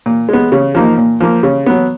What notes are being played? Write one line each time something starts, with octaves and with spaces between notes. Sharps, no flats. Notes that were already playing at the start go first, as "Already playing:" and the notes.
A#2
G#3 B3
C#3
F3 A#3 D#4
A#2
F3 A#3
C#3
F#3 B3